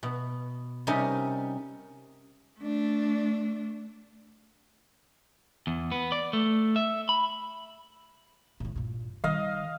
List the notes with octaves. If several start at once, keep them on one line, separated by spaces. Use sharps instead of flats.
B2
C3 G3 C#4 D#4 A#4
A3 D4
E2
B3
D5
A3
E5
B5
A2 D3
G2 A#2
D#3 G3 D#5 F5